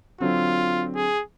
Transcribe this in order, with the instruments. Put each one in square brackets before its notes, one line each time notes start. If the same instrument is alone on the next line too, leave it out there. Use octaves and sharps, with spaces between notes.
[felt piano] D3 F#3 C4 [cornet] F4
[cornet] G#4